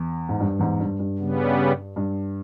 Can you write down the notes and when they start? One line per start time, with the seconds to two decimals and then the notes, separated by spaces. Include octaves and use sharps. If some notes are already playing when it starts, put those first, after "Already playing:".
Already playing: E2
0.29 G#2
0.40 G2
0.59 E2 G#2
0.80 G2
0.99 G2
1.18 C#3 G3 B3
1.96 G2